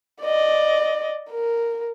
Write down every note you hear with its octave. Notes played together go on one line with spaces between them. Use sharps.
D5 D#5
A#4